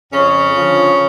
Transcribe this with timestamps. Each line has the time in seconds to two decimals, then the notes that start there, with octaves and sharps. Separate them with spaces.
0.12 F2 C#3 C#4
0.56 D3 F3